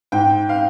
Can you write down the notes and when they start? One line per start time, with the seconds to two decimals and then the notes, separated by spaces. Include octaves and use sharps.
0.12 G#2 G5
0.49 F5